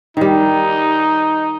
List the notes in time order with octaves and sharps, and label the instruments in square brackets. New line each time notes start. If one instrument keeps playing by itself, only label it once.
[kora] D#3 G3 [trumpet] D#4